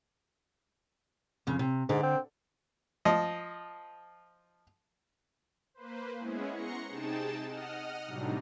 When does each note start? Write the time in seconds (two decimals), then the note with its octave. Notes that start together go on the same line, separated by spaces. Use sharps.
1.47 F2 C#3
1.59 C3
1.89 G#2 D3
2.03 C4
3.05 F3 D#5
5.74 A#3 B4 C5
6.18 G#3 B3 C#4 E4 G#4
6.53 F#5 A#5 C6 C#6 A#6 C#7
6.89 C3 D#4 G#4 G5 A5 E7
7.46 D#5 F#5 D#6 F6
8.06 A2 C3 F#3 G3 D4 D#4